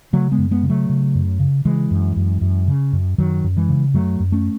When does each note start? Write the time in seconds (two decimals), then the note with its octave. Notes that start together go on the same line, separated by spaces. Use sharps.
0.13 C#3 F#3 A3
0.32 G#3 B3
0.38 F#2
0.51 G#3 B3
0.63 C#3
0.70 F#3 A3
0.89 C#3
1.15 F#2
1.40 C#3
1.65 C#3 E3 G#3
1.91 F#2
2.16 F#2
2.41 F#2
2.68 C#3
2.93 F#2
3.18 F#2 D#3 F#3
3.44 F#2
3.57 E3 G#3
3.69 C#3
3.94 F#2 F#3 A3
4.20 F#2
4.32 A3 C#4